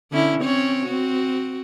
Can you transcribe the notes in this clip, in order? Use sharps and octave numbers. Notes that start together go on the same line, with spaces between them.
D3 C#4 E4
C4 C#4 C#5
C4 F#4